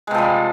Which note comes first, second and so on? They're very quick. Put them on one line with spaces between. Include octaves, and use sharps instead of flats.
G#3 C3 F3 G3